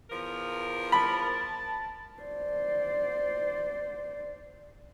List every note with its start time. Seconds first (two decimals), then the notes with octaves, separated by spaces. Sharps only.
0.10 E2 F3 A#4
0.92 A5 B5
2.21 C5 D5